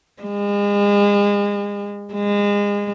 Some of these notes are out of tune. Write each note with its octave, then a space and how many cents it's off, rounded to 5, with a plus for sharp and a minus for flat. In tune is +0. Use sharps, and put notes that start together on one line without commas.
G#3 -35
G#3 -30